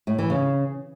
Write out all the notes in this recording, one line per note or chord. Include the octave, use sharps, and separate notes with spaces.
A2
E3
C#3